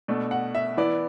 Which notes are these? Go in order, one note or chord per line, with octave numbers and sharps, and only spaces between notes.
B2 A3 D4
F#5
E5
E3 B3 E4 D5